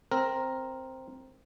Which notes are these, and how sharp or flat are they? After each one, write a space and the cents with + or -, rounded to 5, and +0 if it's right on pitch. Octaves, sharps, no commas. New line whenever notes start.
C4 +0 A#4 +0